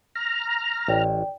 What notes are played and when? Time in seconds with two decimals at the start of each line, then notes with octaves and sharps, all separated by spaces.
0.15 A#5 F6
0.88 A1 D5 G5